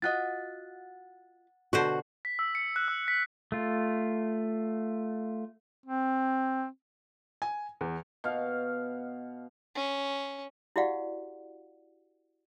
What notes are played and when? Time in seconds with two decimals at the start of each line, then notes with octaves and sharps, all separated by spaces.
0.02 F4 F#4 D#5 F#5 F#6 A6
1.73 B2 D3 F#4 C5
2.25 B6
2.39 E6
2.55 C#7
2.76 F#6
2.88 E6
3.08 B6
3.52 A3 F4
5.86 C4
7.42 G#5
7.81 E2
8.24 B2 F5
9.76 C#4
10.76 E4 F#4 G4 D5 F5 F#5